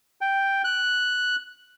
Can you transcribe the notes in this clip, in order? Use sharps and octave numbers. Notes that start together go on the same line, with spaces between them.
G5
F#6